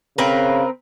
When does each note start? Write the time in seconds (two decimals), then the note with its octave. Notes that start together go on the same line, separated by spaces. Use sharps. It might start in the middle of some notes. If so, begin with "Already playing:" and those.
0.18 C#3 C4 A#4 B4